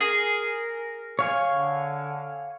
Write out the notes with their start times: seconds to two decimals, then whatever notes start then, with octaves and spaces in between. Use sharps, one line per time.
0.01 G#4 A#4
1.19 C#5 F5 G#5
1.48 D3